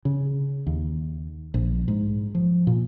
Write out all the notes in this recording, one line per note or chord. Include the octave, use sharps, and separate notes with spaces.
C#3
D#2
A#1
G#2
F3
A#2